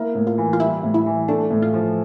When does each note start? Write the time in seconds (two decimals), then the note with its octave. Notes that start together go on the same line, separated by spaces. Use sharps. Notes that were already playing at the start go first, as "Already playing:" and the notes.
Already playing: A#3 E4
0.15 A2
0.27 F4
0.38 E3
0.53 F4
0.60 G3 E4
0.83 A2
0.94 E4
1.06 E3
1.28 A3 D4
1.51 A2
1.62 F4
1.74 F3